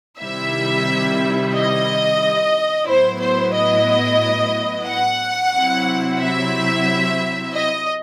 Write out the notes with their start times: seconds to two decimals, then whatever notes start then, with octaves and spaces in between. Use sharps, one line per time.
0.20 C3 D#3 G3 C4 E4 E5
1.53 D#5
2.87 A2 F#3 B3 E4 C5
3.20 C5
3.53 D#5
4.87 F#5
5.53 C3 F#3 C4 E4
6.20 E5
7.53 D#5